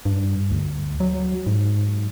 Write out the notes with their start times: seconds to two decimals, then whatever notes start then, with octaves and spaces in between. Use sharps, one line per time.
0.05 G2
0.51 D2
1.00 F#3
1.47 G#2